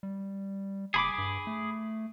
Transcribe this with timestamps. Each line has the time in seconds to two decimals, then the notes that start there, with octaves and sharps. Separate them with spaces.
0.03 G3
0.94 F#1 G#4 B5 D6
1.18 G2
1.47 A3